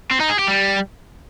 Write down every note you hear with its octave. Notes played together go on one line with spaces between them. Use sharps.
C4
D#4
G#4
G4
G3